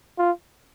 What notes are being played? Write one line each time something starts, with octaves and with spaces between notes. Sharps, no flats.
F4